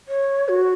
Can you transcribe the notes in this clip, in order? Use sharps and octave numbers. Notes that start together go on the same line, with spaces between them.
C#5
F#4